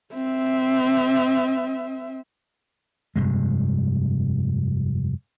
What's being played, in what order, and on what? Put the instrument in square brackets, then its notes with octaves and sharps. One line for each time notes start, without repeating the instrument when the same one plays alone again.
[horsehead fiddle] C4 E5
[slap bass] F1 G2 C3 G#3